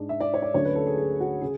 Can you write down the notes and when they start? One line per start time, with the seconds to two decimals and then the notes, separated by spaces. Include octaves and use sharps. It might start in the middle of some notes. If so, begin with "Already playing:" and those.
Already playing: G#2 G#3 D4
0.09 E5
0.20 D5
0.34 C#5
0.42 D5
0.54 D2 D3 F#3 C#4 C#5
0.65 B4
0.75 A4
0.87 G#4
0.98 G#4
1.20 F#4
1.41 C#3 G#4